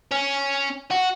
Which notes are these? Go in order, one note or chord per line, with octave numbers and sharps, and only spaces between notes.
C#4
F#4